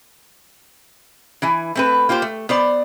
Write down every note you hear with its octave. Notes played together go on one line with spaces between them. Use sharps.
E3 E4 G#5
A3 C4 B4
A#3 F4 G4 C5
A3
B3 C5 D5